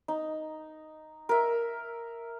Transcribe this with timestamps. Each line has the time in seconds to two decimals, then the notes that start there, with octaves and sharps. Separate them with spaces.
0.08 D#4
1.29 A#4 E5